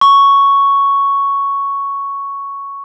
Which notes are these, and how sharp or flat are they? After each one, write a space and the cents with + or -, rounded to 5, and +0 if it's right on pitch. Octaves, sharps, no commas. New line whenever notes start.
C#6 +0